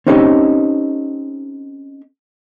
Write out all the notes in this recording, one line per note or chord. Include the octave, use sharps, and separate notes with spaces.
C4 C#4 D#4 G4 A4